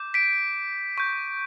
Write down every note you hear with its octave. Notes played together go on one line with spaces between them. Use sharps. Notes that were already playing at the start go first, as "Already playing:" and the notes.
Already playing: D6 G6
B6 D7
C#6 G6